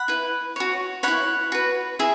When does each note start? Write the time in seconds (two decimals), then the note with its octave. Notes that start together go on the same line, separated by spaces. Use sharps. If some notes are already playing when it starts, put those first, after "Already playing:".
Already playing: F#5 B5
0.08 E4 B4
0.56 F#4 C#5
1.03 E4 C#5 F#5 B5
1.52 F#4 B4
1.99 E4 G#4 E5